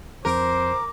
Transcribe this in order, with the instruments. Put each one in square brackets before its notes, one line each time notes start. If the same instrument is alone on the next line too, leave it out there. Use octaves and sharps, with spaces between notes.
[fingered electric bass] F2 F3 C4 [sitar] A#4 [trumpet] C5 [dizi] D6